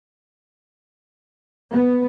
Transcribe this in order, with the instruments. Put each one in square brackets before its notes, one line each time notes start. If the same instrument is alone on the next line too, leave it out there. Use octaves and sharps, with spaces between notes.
[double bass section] B3